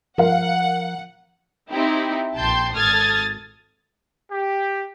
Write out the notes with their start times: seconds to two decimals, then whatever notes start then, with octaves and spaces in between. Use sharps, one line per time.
0.18 F3 A#4 F5 F#5
1.71 C4 D#4 E4 G4
2.36 A#1 G5 A5 C6 G6
2.74 G#1 A4 D#6 F6 G#6 A6
4.32 G4